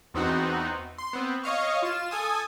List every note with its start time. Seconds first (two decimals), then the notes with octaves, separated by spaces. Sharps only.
0.14 E2 B3 C4 D#4 F#4
0.98 C6
1.13 B3 C4
1.43 C#5 D#5 F5 C#6
1.82 F4 E7
2.11 A4 G#5 D#6